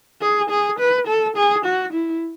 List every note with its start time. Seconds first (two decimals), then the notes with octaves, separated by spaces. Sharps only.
0.21 G#4
0.50 G#4
0.79 B4
1.07 A4
1.36 G#4
1.65 F#4
1.93 E4